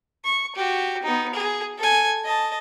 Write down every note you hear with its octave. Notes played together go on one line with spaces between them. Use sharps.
C#6
F#4 G4
B3 D#4
G#4
A4 G#5
D#5 A5